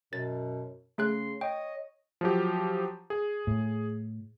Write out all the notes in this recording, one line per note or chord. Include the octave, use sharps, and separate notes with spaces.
F#2 B2 A6
C#3 A3 G#4 C6 F#6
C#5 D#5 G5
F3 F#3 G4
G#4
A2